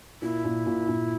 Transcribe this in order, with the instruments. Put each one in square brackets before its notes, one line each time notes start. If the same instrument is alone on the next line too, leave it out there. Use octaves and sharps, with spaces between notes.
[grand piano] A#2 [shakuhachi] E4
[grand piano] A#2
A#2
A#2